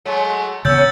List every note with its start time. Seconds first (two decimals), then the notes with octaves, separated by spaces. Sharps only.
0.05 F#3 G#3 A3
0.65 C#3 F#3 B3 C#4 E6 G6 A6